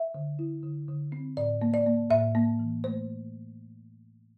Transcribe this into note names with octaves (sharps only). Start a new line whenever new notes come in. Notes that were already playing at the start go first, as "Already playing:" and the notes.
Already playing: E5
D3
E4
D3
D3
C4
A2 D5
A#3
D5
A#3
A2 E5
A#3
E3
A3 C5